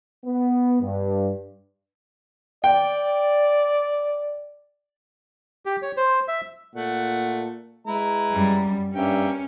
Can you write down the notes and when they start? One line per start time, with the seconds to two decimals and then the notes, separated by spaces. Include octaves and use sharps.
0.24 B3
0.81 G2
2.64 D5 G5
5.66 G4
5.82 C#5
5.97 C5
6.28 E5
6.75 A#2 A3 F#5
7.87 G#3 E4 B4 A#5
8.32 F#2 G3
8.94 G2 A#3 C#4 E5 G5